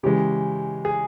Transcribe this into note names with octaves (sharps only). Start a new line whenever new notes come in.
C#3 E3 G#3 G4
G#4